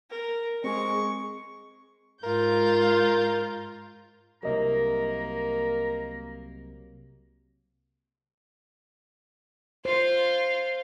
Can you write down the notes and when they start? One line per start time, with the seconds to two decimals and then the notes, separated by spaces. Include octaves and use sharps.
0.10 A#4
0.64 G#3 C4 G#4 C#6
2.24 G#2 F4 A#4 G6
4.43 C2 C3 F#3 A#3 A#4 D#5 A#5
9.85 F4 C5 F5